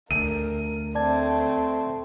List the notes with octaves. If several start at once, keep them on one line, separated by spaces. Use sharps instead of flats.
D2 A#4 D#7
A3 C4 D5 A5 G#6